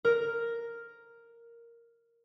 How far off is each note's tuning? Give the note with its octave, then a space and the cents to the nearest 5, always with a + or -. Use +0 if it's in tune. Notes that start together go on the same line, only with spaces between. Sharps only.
A#4 +0